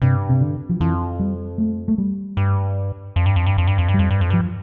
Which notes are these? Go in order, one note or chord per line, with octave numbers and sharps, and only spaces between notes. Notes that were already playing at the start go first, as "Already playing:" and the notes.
G2 C3
C3
D3
F3
F2 E3
G3
A3
A3
G3
G2
F2
G2
F2
G2
F2
G2
F2
G2
G3
F2
G2
F2
G2 F3